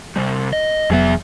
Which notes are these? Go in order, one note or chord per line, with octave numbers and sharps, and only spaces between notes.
C3 G3
D#5
F1 E2 F#3 B3 G#4 E5